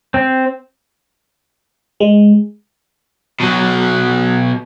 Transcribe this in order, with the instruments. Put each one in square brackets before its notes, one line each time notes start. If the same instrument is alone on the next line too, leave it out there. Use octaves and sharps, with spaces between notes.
[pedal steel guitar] C4
[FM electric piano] G#3
[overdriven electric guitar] B2 F#3